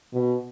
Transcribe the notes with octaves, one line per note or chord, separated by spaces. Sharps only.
B2